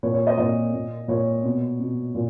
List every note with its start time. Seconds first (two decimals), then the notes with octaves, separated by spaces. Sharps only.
0.03 A#2 C#5
0.14 C#5
0.27 D#5
0.38 A#2 D#5
0.74 A#2
1.08 A#2 C#5
1.44 B2
1.80 B2
2.15 A#2